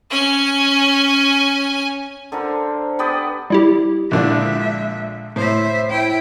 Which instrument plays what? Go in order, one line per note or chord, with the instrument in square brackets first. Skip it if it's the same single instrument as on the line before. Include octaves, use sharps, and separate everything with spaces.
[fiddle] C#4 G#5
[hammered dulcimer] D3 A4 A#4 [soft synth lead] C5
[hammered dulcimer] B3 G4 B4 [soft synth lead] D#6
[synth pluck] G3 E4 G4
[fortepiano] A#1 D3 D4 [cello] G#3 E5
[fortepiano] A2 [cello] C5 E5
[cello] E4 G5